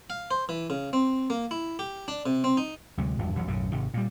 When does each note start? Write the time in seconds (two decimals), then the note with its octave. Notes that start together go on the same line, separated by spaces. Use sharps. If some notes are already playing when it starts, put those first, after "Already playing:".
0.10 F5
0.31 C5
0.49 E3
0.70 C#3
0.93 C4
1.30 A#3
1.51 E4
1.79 G4
2.08 D4
2.26 C3
2.44 C4
2.57 D#4
2.98 D2 C3 F#3 G#3
3.19 G#1 E2 G2 F3
3.35 A1 E2 A2 F#3
3.47 B1 F#2 A2 C#3
3.72 G#1 C3 D#3
3.94 A#2 G3